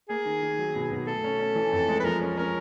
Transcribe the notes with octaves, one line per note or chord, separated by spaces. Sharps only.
A#3 G#4
D#3
D#3
F#3
B2
B2
A3 A4
C#4
C#4
E3
F2
G#3
B4
F3 A#4
C#4
C#4 A#4